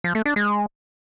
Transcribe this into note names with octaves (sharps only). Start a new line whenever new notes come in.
F3
A3
D4
G#3